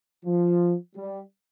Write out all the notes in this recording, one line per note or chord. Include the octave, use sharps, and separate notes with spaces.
F3
G3